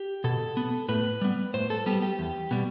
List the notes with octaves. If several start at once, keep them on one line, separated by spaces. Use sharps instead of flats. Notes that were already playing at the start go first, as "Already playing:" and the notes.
Already playing: G4
B2 A4
B3
A2 B4
G3 B3
A2 C5
A4
G3 B3 G4
G4
E2
B2 G3